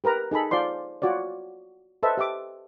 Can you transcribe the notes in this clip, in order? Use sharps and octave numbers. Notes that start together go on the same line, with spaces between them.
G4 A#4 B4 A#5
D#4 G#4 A4 B5
F4 C5 D5 C6
F4 F#4 C#5 D5
A4 B4 C5 D#5 E5 A5
G4 E5 D6